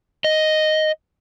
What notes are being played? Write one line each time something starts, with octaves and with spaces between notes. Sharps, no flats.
D#5